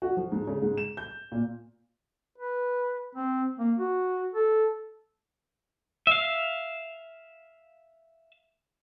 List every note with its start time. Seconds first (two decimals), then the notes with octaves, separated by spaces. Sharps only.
0.02 F#4
0.17 F3
0.32 G#2
0.47 C#3
0.62 G#2
0.77 E7
0.97 G6
1.32 A#2
2.38 B4
3.15 C4
3.59 A#3
3.78 F#4
4.34 A4
6.07 E5 F5